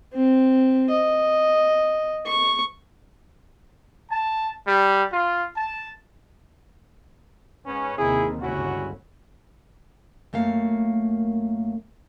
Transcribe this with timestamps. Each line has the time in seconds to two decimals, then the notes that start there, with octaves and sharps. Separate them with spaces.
0.13 C4
0.90 D#5
2.26 C#6
4.11 A5
4.68 G3
5.13 F4
5.57 A5
7.66 G#2 B3 C#4
7.98 D#2 C3 D#3 E4 G#4
8.42 G1 C#2 G2 C#4 E4 F#4
10.33 F#2 A3 A#3 F5